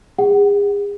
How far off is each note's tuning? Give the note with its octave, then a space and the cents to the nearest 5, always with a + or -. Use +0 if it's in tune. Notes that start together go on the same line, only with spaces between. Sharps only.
G#4 -40 F#5 +25